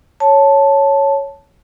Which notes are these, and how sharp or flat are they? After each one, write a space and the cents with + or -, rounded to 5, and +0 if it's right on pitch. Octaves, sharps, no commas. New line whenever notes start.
C#5 +0 A5 +0